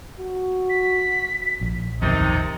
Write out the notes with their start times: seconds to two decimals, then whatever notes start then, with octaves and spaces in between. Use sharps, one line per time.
0.19 F#4
0.69 B6
1.61 A#1
2.02 D1 B1 F2 C3 D#3 D#4 A6